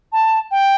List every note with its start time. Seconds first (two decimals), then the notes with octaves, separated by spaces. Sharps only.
0.13 A5
0.51 G5